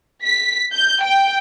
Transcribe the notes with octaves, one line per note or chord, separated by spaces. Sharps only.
B6
G6
G5